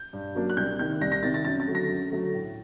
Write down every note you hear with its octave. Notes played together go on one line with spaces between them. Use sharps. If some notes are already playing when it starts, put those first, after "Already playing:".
Already playing: G6
G2
F#3 A#3 D4
F#6
C2 G6
C3 D#3 G6
C2 A#6
A#6
C3 D#3 A6
A6
F#2 A6
A6
D3 F#3 A3
A#6
F#2
D3 F#3 A3
A2